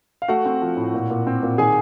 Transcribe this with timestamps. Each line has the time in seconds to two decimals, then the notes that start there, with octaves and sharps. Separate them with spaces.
0.22 F5
0.28 A3 F#4 F#5
0.45 C4
0.62 F3
0.77 A2
0.94 A#2
1.10 A#2
1.27 C4
1.43 A#2
1.58 D#3 G#4 G#5